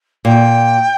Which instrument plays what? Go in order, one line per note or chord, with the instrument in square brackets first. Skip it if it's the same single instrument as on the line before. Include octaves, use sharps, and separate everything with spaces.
[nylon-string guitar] A#2 [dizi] G5